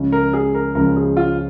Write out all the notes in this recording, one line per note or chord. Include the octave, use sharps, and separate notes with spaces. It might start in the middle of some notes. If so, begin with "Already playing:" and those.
Already playing: C#2 C#3 F3 G#3 C#4
A#4
G#4
A#4
C#2 C#3 F3 G#3 C#4 A#4
G#4
F4